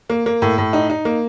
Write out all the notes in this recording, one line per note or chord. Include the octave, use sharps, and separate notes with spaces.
A#3
A#3
A2
A2
D#4
D#4
A#3